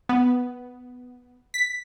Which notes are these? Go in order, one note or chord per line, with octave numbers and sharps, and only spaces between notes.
B3
B6